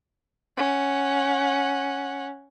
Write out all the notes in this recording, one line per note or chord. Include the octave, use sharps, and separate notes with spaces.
C#4 F#5